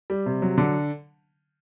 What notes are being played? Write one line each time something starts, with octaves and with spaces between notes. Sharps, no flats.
G3
C3
F#3
D3